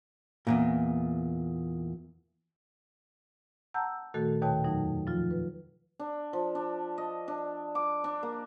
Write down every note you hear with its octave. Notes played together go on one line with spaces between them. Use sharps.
E2 G2 A#2
F#5 A5 A#5 E6 G6
A#2 D#3 A3 F#4 A4
D#2 B2 D#3 C#5 G5 A5
F2 F#3 D#4
F3 F4
B4
D4
F3
D4
D#5
D4
D6
D4
A#3